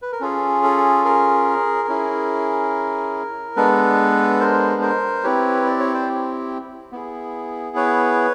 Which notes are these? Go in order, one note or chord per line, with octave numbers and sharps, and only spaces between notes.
B4
A#4
C#4 F4 G#4 A4
A4
G#4 A#4
C#4 E4 G#4
G#3 B3 D4 A4 B4
A#4 C5
A#4 C5
C4 E4 G4 B4 C#5
D5
C#5
C5 D5
B3 E4 G#4
B4 C#5